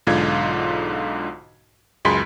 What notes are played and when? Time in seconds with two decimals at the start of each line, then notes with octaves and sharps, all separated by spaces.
0.07 B1 G#2 D3 F4 G#6
2.05 C#2 F#2 G#3 B5 C6 B6